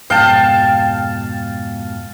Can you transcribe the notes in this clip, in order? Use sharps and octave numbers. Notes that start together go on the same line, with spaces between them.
F2 G#2 B2 F5 G5 A5